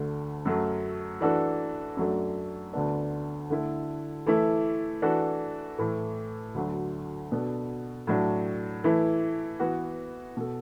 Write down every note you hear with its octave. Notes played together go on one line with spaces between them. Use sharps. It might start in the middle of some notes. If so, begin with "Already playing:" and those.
Already playing: D2 D3 A3
F#2 F#3 A3
E3 D4 F#4 A4
F#2 F#3 A3 D4
D2 D3 B3 D4
D3 A3 E4 A4
E3 A3 E4 A4
E3 D4 F#4 A4
A2 E3 A3
D2 D3 F#3
B2 B3 D4 F#4 A4
A2 F#3 D4
E3 A3 E4
E3 B3 F#4
B2 B3 F#4 A4